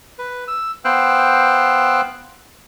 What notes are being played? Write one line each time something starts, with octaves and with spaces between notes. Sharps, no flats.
B4
E6
B3 C5 F5 G5 E6 F#6